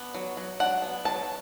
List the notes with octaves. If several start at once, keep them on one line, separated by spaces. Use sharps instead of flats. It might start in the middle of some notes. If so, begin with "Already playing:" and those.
Already playing: B3 D4
F#3
F#3
D4 F#5
B3
F#3 A5